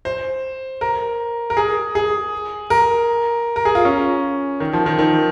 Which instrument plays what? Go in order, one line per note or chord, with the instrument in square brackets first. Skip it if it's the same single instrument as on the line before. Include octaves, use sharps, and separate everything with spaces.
[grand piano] C5
A#4
A#4
G#4
G#4
A#4
A#4
G#4
F4
C#4
D#3
F3
D#3
D#3